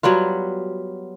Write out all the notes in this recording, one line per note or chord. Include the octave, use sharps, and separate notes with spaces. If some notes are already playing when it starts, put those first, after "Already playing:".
F#3 G3 B3 F4